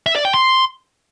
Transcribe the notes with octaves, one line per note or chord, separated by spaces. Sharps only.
E5
D5
G5
C6